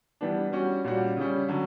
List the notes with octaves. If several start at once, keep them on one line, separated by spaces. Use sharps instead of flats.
E3 G3 B3 D4
G3 C#4 F#4
A#2 G3 C#4 F#4
C#3 G3 C#4
D3 F#3 C#4